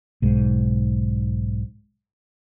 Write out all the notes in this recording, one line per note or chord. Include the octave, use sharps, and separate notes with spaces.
B1 G#2